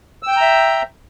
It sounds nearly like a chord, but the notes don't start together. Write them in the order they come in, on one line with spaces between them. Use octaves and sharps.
E6 G5 G6 A#5 E5